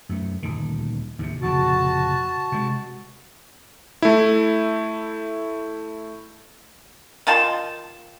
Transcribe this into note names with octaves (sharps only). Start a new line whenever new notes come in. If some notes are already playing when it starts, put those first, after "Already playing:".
F#2 A3
D#1 D2 D#3
D#2 A2 C3
F1 A#2 C#3 F#4 A5
C3 G#3
A3 E4
D#3 F4 A5 C6